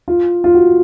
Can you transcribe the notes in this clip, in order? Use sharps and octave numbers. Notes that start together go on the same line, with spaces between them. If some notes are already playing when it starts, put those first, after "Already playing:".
F4
F4
F#4